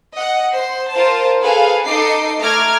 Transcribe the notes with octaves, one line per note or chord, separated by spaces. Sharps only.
D#5 F#5
C5 C6
F4 A#4 C5 A5
G#4 A4 B4 F5
D#4 A4 D#5 D6 C7
A3 A#5 D6 F6 G#6